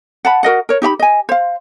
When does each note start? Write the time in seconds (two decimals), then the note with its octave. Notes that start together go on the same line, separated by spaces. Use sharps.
0.25 F#5 A5 B5
0.43 F#4 A#4 D#5 F#5
0.69 A#4 C#5
0.82 D#4 G4 E5 B5
0.99 D#5 G#5
1.29 C5 F5